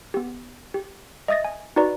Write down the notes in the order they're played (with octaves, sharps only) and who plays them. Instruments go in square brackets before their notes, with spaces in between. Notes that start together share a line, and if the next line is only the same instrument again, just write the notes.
[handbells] B3 G4
G4
D#5 E5 D#6 A6 A#6
G#5
D#4 F#4 B4 D5 A#5